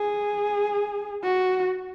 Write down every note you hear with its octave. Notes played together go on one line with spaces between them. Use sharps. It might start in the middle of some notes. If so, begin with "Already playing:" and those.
Already playing: G#4
F#4